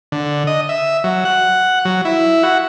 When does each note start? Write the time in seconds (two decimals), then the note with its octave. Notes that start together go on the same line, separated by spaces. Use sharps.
0.12 D3
0.47 D#5
0.69 E5
1.04 F#3
1.25 F#5
1.85 F#3
2.05 E4
2.43 F#4